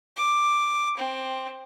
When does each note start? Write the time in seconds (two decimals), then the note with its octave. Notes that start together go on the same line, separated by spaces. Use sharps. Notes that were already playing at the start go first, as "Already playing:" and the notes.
0.16 D6
0.97 C4